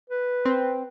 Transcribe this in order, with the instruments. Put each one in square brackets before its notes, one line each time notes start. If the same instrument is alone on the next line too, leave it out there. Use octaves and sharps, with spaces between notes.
[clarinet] B4
[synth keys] C4